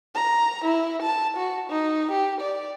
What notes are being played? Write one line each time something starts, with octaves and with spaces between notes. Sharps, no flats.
A#5
E4
A5
F#4
D#4
G4
D5